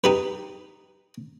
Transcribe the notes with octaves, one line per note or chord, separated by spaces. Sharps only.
D#4 G4 B4